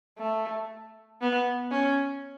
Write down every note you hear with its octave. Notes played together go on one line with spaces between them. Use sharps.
A3
B3
C#4